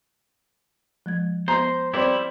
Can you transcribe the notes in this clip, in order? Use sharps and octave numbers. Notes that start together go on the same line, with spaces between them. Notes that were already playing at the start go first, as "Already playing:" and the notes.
F3 G#3 G#6
B3 C5 A#5
G3 C4 E4 G4 C5 D5 D6